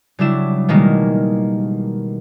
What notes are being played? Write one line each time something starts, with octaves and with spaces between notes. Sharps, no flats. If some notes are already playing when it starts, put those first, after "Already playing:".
C#3 F#3 G3 D4 E4 E7
B2 D#3 G3 G#3 A#3